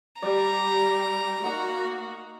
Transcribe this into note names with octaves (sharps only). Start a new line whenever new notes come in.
G3 G4 D5 A#5
A#3 D#4 F#4 F#5